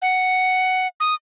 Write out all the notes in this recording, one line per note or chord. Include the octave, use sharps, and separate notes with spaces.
F#5
D#6